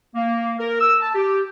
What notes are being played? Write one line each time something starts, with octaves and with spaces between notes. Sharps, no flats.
A#3
A#4
E6
A5
G4